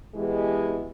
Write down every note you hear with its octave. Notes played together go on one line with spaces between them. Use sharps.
B2 E3 G#3 G4